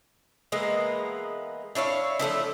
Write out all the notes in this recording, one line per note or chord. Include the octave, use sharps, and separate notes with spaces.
E3 G#3 A#3 B3
D4 E4 C#5 F5
F3 A3 B3 E4